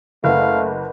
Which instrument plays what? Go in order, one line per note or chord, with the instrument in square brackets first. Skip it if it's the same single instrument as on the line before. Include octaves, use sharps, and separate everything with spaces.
[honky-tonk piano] F#1 [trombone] A3 [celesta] A#4 B4 F#5 [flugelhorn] F5